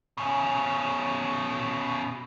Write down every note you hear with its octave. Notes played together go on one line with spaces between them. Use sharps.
B2 C#4